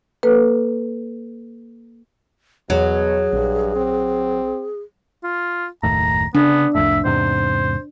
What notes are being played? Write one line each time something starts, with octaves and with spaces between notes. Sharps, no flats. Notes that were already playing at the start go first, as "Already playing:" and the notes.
A#3 A4 B4
E2 B2 F#3 G#4
A#1 G2
C4
F4
F#1 D#2 A2 A#5
C#3 B3 D4
C2 F2 A2 E5
E2 G#2 C3 C5